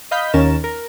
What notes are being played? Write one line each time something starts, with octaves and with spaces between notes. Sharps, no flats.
D#5 F5 B5 G6 B6
D#2 D#3 C#4 A#4 A6 E7
A#4